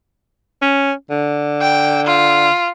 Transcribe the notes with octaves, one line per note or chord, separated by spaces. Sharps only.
C#4
D3
G5
F4